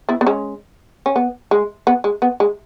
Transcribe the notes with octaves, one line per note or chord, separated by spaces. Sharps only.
B3 E4
B3
G#3 C#4
C#4
B3
G#3
B3
G#3
B3
G#3